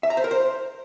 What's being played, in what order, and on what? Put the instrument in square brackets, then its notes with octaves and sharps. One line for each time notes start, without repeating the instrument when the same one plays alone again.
[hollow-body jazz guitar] E5
A#5
C5
A#4
C5